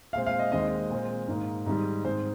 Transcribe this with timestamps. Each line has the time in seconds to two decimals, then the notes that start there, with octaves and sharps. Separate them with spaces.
0.13 A#2 G#3 C4 F5
0.26 F5
0.39 D#5
0.52 D#2 D#3 G#3 C4 D#5
0.90 A#2 G#3 C4
1.28 G#2 D#3 A#3
1.66 G#2 D#3 G3
2.05 G#2 D#3 G#3 C4 C5